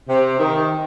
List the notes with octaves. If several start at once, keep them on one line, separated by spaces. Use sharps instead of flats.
C3
D#3